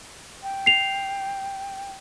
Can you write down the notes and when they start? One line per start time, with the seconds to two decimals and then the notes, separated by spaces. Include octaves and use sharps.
0.43 G5
0.66 C7 F7